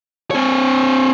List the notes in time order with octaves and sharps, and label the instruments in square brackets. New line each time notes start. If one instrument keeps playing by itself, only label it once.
[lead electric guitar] C4 C#5